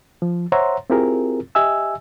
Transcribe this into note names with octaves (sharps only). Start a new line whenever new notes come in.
F3
C5 C#5 E5 F#5 A#5 C6
C4 E4 F4 G4 G#4 A#4
G4 D#5 E5 G#5 E6